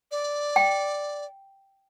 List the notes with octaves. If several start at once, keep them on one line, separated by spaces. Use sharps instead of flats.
D5
G5